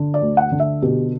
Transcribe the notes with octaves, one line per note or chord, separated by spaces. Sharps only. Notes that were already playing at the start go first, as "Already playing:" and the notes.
Already playing: D3
D5
D2
F#5
D3
E5
B2 G4